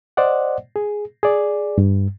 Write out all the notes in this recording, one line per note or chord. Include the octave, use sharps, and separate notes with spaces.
C5 D5 D#5 F#5
G#4
G#4 D5
G2